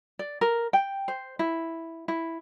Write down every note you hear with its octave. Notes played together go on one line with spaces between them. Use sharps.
D5
A#4
G5
C5
E4
E4